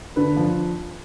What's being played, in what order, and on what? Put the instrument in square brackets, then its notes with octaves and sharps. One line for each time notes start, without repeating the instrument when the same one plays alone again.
[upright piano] D3 B4
F3